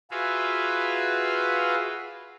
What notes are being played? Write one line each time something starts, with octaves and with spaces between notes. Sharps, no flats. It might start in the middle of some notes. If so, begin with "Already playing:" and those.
F4 F#4 G#4 B4 E5 F5